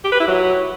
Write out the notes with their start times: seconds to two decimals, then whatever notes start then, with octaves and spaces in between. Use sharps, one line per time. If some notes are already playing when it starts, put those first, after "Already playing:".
0.04 G4
0.12 B4
0.20 E4
0.28 F#3